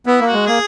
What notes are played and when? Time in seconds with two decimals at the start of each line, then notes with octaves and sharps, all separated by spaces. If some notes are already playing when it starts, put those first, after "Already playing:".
0.06 B3 E4
0.21 A#3
0.26 F#4
0.33 G#3
0.46 A#3 G#4